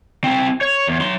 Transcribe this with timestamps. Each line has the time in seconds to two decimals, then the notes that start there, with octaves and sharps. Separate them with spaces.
0.24 C4 E4
0.61 C#5
0.87 E2
1.01 F#3 C6